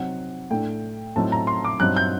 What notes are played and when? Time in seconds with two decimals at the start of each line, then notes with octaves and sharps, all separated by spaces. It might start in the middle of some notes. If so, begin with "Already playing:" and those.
Already playing: C3 F#3 C4 D#4 F#5
0.50 A2 A3 D4 G5
1.16 A2 F#3 C4 D#4 A5
1.32 A#5
1.47 C6
1.65 D6
1.80 G2 F#3 C4 D#4 F#6
1.97 G6